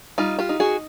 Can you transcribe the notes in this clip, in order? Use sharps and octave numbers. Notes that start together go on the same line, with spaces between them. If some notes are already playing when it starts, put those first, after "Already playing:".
G3 D#4 F4
F4 G4
D#4
F#4 G#4